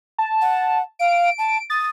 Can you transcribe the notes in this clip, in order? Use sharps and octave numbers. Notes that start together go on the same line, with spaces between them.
A5
F#5
F5 D7
A5
D#6 A6